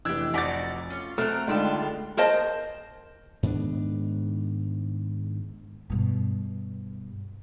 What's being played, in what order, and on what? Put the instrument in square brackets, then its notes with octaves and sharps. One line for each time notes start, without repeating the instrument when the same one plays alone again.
[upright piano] F1 E3 [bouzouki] D4 G4 [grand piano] E6 G#6
[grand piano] F1 B6 [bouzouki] D#4 F#4 D5 [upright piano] G#5 D6 A6
[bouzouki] C#4 F4
[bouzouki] F#3 C4 A#4 [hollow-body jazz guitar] A3 [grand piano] F6 F#6
[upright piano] C#2 D#4 E7 [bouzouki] D3 G3 F4 [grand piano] G#3 D4
[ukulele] A#4 C5 D#5 A5
[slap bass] G#2 D#3 B3 D4
[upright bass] G2 B2